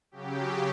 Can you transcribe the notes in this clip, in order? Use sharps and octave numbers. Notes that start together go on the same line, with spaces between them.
C#3 F#3 G4